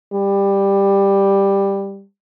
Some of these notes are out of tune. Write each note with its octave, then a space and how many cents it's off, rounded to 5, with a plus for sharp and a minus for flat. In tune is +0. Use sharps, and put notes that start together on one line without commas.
G3 +10